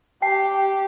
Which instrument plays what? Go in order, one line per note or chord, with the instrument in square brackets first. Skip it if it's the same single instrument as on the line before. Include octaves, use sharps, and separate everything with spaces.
[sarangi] G4 [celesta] G5 A5 C7